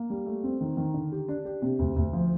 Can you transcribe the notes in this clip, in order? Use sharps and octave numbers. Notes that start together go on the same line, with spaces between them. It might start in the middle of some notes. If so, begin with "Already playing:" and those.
Already playing: A#3
G3
A3
C4
D#3
D#3
D3
G4
D4
G4
C3
D2
D2
F3